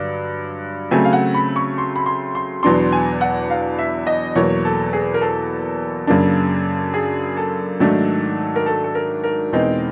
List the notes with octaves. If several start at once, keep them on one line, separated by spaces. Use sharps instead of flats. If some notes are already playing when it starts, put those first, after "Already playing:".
Already playing: G2 D3 F#3
C#3 F#3 A3 C4 G#5
F5
F#5
B5
C#6
C6
B5
C6
C6
E2 B2 F#3 B3 D4 C6
G#5
F#5
F5
E5
D#5
E2 B2 F#3 A#3 C#5
A4
G#4
A#4
A4
F#2 C#3 F#3 A#3 D4
G#4
A4
G#2 D#3 F#3 A3 D4
A#4
A4
A4
A#4
A#4
E2 B2 G#3 C4 D#4